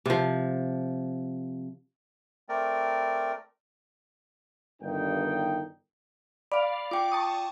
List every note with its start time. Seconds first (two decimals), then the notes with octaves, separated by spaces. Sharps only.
0.06 C3 F3
2.49 A3 C4 A#4 D5
4.82 G1 G2 D#3 D#4 G5
6.52 D5 F5 B5
6.91 F4 G5 D6
7.12 A5 C#6 D#6